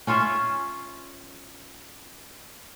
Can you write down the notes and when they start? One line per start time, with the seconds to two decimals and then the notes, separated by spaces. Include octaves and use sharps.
0.07 C#4 F4 C#5 E5